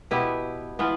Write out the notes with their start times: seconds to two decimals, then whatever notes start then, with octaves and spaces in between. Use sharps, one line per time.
0.11 B2 B3 E4 G4
0.79 E3 B3 F4